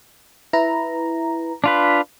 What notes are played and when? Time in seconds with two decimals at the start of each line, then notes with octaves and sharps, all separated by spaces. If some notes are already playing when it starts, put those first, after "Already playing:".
0.53 E4 B4 A#5
1.64 D4 F4 B4